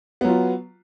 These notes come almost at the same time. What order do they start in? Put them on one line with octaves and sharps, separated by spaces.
B3 F#3 F4